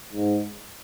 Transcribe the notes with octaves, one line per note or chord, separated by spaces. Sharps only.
G#2